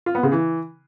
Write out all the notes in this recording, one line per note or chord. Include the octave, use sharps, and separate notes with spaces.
F4
B3
C#3
E3